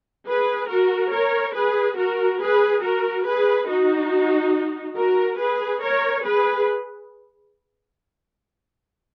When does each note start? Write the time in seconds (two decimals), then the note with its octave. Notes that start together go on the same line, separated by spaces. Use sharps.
0.27 G#4 B4
0.69 F#4 A#4
1.12 A#4 C#5
1.55 G#4 B4
1.97 F#4 A#4
2.41 G#4 B4
2.83 F#4 A#4
3.26 G#4 B4
3.68 D#4 F#4
4.97 F#4 A#4
5.39 G#4 B4
5.82 A#4 C#5
6.25 G#4 B4